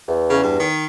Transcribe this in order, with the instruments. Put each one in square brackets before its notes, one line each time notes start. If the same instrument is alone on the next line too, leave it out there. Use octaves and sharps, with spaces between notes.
[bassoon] E2
[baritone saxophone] C#3
G2
D#3